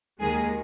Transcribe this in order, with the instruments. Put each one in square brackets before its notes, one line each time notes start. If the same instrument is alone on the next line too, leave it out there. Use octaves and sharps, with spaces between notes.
[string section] D#2 D#3 G#3 G#4